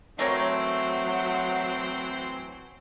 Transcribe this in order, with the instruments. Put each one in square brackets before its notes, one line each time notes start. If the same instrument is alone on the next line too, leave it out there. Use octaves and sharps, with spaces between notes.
[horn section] E3 C4 C5 [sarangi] F#3 [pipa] A3 A#4 C#5